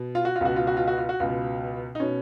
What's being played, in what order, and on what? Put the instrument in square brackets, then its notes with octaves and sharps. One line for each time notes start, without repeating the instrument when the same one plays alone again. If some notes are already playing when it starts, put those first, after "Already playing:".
Already playing: [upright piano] B2
F4
F#4
F4
C#2 B2 F#4
F4
F#4
F4
F#4
F4
F#4
C#2 B2 F4
D#4
B2 C#4